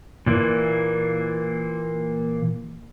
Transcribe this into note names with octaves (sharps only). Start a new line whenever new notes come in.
A#2 E3 A#3